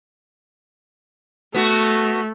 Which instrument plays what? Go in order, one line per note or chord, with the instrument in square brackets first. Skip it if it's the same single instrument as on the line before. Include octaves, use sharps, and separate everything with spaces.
[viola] A3 [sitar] B3 F#4